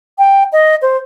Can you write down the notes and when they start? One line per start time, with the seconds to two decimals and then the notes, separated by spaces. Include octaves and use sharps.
0.18 G5
0.52 D#5
0.82 C5